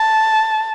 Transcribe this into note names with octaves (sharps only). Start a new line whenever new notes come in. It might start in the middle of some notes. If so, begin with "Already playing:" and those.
Already playing: A5